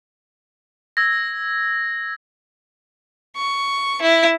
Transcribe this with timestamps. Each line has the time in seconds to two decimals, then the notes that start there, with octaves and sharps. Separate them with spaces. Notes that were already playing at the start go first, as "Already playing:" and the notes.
0.97 E6 G#6 A#6
3.36 C#6
4.02 E4